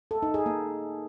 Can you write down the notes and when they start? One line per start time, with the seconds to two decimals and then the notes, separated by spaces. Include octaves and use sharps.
0.11 A4
0.23 D#4
0.34 G#4
0.46 A#3